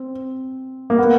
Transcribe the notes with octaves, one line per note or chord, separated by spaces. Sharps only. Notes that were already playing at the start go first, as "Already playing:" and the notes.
Already playing: C4
A#3
B3